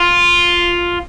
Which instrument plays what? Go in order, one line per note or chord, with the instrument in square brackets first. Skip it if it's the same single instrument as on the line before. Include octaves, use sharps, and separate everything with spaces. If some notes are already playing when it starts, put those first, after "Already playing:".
Already playing: [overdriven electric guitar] F4